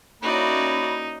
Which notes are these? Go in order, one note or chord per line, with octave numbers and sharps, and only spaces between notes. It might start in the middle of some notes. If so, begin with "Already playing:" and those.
A#3 C#4 D#4 E4 F#4 D5 B5